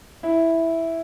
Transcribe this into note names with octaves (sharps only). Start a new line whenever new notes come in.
E4